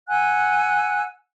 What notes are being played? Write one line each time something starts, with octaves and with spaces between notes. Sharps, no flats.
F#5 G#5 E6 F#6